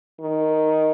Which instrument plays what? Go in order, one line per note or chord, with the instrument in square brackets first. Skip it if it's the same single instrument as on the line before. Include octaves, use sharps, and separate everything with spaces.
[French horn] D#3